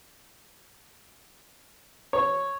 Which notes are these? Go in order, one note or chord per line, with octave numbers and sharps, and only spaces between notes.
C#5